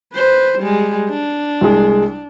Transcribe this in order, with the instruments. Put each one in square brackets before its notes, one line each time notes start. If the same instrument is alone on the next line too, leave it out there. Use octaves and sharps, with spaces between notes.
[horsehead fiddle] B4 C5
G3 G#3
D4
[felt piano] C2 G#3